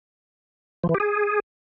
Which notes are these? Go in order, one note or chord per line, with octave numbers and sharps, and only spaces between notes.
F3
E3
G4
G#4